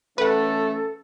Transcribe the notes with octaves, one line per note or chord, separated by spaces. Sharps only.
E3 A3 C#4 A4 B4 F#5